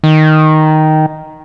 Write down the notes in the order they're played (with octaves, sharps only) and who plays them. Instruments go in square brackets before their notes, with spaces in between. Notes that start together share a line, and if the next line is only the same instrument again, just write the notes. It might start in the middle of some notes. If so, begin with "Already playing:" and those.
[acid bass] D#3